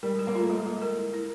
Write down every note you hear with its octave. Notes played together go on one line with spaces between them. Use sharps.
G3 A#4
G#3
A#4
A#3
A3 F4
G#3 A#3
G#3
A#4
E4
E4